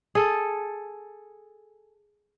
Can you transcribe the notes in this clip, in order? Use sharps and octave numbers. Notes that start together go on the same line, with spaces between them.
G#4 A4